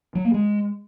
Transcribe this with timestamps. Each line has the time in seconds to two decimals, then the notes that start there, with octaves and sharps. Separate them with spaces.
0.15 F#3
0.25 A#3
0.34 G#3